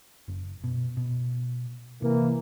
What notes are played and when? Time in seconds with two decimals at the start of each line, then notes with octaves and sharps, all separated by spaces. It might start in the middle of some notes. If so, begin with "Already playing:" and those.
0.28 F#1
0.64 B2
0.97 B2
2.02 C3 E3 A#3